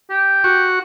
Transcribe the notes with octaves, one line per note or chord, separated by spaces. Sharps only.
G4
F#4 C#6